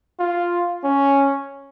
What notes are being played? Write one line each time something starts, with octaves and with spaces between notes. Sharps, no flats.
F4
C#4